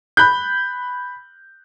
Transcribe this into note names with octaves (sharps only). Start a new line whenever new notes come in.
B5 F#6 G6